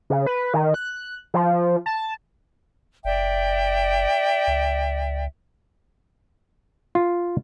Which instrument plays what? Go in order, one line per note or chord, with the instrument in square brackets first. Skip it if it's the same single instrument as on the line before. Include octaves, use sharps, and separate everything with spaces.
[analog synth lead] C#3
B4
D#3
F#6
F3
A5
[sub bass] F#1 [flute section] D5 E5 G5
[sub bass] C#2
[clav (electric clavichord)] F4